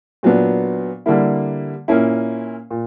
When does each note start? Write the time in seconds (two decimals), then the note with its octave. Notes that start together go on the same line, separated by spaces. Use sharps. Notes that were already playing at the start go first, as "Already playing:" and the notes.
0.23 A#2 F#3 B3 D4
1.06 D3 G3 A#3 E4
1.88 A#2 A#3 C#4 E4
2.71 A#2